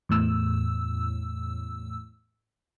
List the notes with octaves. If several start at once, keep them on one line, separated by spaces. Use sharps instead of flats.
E2 A2 E6